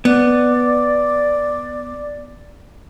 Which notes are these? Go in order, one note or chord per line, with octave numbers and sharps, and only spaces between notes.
B3 D5